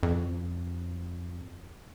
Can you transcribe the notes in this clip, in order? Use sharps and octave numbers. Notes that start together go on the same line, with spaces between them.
F2